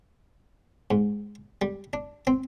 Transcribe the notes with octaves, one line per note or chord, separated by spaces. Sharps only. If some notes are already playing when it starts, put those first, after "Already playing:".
G#2
G3
D4
C4